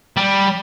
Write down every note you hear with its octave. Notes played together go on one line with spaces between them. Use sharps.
G3